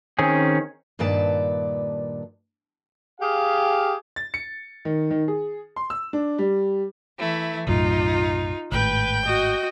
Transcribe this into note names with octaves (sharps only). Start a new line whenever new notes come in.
D#3 C4 C#4 G#4
G2 A#2 D#3 B4 D5 A5
G4 G#4 F5
A6
C#7
D#3
D#3
G#4
C6
E6
D4
G3
E3 A3 E4
B1 F#2 A2 D#4 F4
G#1 A2 B4 G5 G6
F#4 D#5